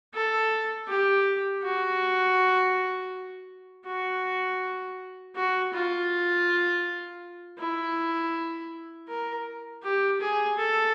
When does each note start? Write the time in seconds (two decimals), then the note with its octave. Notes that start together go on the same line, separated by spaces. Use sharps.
0.14 A4
0.88 G4
1.63 F#4
3.86 F#4
5.36 F#4
5.73 F4
7.59 E4
9.08 A#4
9.83 G4
10.20 G#4
10.58 A4